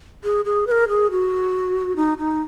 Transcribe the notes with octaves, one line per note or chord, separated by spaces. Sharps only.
G#4
G#4
B4
A#4
G#4
F#4
D#4
D#4